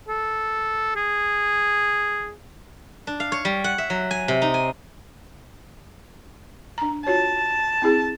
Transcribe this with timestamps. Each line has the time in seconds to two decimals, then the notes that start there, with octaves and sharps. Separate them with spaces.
0.08 A4
0.96 G#4
3.07 D4
3.20 F5
3.32 C#5
3.45 G3
3.64 F#5
3.78 E5
3.90 F#3
4.11 G#5
4.28 C3
4.42 D#4
4.54 G#5
6.78 D4 A#5
7.07 F4 F#4 C#5 A5
7.82 C4 E4 G#4